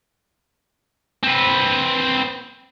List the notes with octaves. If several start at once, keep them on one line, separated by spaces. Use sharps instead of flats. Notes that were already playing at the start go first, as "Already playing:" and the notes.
C4 B4